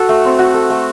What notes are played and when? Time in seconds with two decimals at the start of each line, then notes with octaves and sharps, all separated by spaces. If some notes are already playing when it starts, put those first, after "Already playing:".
Already playing: F#4 A4
0.09 A3
0.25 C4
0.39 F#4
0.54 A4
0.70 A3